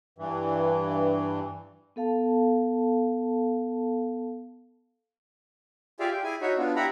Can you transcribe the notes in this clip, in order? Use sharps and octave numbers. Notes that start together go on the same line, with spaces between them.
G2 E3
B3 A4 F5 A5
F4 G4 G#4 D5 E5 F5
G5
E4 G#4 G#5
D#4 F#4 C#5 E5
B3 D4 F4
E4 G4 E5 F#5 A#5 B5